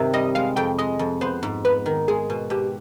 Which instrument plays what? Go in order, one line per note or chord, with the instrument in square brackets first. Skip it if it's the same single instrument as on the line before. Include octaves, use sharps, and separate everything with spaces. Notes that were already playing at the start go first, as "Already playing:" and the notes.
Already playing: [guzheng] G2 C3 D#3
[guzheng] G3 [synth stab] D#5
[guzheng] G#3 [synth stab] F5
[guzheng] F2 [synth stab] G5
[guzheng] G#3 [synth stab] D#5
[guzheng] F2
[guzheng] B3 [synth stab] C5
[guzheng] G#2
[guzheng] B3 [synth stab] B4
[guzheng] D#3
[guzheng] G#3 [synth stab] G#4
[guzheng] B2
[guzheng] B2 [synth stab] G4